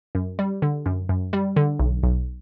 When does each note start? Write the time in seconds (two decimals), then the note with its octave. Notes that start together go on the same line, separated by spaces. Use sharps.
0.15 F#2
0.39 G3
0.62 D3
0.86 F#2
1.09 F#2
1.33 G3
1.56 D3
1.79 B1
2.03 B1